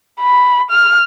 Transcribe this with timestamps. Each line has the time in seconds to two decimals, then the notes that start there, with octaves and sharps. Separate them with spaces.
0.20 B5
0.71 F6